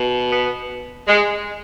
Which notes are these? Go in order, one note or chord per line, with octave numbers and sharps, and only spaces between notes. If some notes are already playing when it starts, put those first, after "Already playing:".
Already playing: B2
B3
G#3